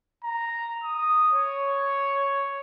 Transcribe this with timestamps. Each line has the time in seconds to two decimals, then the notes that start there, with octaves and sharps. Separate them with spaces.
0.24 A#5
0.84 D#6
1.34 C#5